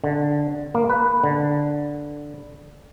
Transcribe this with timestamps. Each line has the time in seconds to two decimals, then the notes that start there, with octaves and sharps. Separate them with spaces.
0.04 D3
0.74 A#3
0.89 B4
1.24 D3